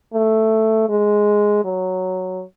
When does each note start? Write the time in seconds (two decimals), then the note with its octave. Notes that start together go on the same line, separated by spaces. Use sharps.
0.13 A3
0.89 G#3
1.65 F#3